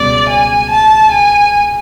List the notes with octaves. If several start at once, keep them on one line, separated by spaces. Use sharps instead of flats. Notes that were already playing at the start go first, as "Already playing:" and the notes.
Already playing: C#2 B2 G3 B3 D5
G#5
A5
G#5